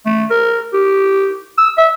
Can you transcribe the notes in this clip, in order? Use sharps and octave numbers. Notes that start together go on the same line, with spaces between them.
A3
A#4
G4
E6
E5